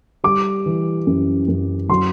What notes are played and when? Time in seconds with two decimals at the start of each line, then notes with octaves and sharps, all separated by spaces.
0.24 G3 D6
0.66 E3
1.07 F#2
1.48 F#2
1.89 F#3 C6